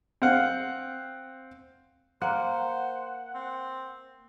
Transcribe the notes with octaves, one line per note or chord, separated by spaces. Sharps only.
C4 F5 F#5
A#3 C5 F#5
C4